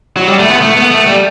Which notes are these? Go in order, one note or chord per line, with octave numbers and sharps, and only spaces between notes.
F#3
G3
A3
B3
A3
B3
A3
G3